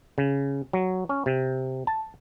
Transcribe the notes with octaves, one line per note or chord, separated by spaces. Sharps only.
C#3
F#3
C#4
C3
A5